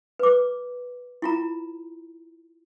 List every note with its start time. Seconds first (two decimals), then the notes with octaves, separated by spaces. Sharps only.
0.19 B4 D6
1.22 E4 F4 A#5